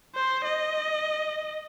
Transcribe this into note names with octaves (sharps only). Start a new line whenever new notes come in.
C5
D#5